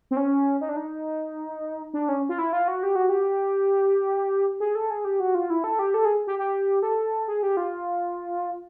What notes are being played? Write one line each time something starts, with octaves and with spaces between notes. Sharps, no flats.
C4
C#4
D#4
D4
D#4
D4
C#4
F4
E4
F4
F#4
G4
F#4
G4
G#4
A4
G#4
G4
F#4
F4
E4
A4
G4
A4
G#4
G4
G4
A4
G#4
G4
F4